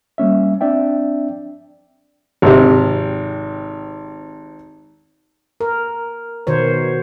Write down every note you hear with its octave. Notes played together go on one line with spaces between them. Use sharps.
G3 A#3 C#4 E5
C4 D4 D5 E5 G5
G#1 C3
A#4
B2 D#3 C5 C#5